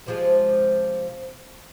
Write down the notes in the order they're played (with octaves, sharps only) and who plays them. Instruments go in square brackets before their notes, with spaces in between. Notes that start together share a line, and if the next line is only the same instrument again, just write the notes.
[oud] C3 F3 G#3